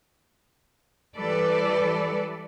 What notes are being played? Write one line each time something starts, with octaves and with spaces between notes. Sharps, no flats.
E3 G3 A4 B4 D5